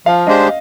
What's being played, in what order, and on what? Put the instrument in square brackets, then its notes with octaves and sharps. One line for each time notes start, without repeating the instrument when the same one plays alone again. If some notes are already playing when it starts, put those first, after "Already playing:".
[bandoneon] F3 [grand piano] F5
[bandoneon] G#3 D4 G4 C5 [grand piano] D#5